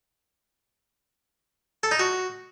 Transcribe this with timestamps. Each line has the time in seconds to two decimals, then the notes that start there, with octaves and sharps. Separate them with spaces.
1.83 A4
1.91 D#4
1.99 F#4